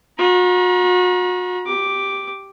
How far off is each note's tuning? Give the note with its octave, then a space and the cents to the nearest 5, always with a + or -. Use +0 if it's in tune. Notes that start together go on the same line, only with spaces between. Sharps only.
F#4 -40 A#5 +35
G4 +0 D6 +0